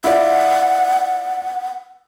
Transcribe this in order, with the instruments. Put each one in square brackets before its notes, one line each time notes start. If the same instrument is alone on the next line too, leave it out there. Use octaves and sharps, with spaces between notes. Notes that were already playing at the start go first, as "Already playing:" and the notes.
[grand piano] E4 F4 D5 [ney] F#5